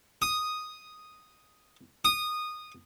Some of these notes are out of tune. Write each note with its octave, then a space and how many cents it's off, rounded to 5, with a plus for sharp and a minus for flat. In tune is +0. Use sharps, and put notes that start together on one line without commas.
D#6 +0
D#6 -15